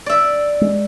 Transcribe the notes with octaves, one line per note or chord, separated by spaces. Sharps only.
D5 E5
G#3